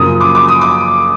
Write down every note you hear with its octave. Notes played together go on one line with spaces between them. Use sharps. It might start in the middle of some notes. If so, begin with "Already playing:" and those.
Already playing: F#2 C#3 F3 A#3 D#6
D6
D6
D#6
D6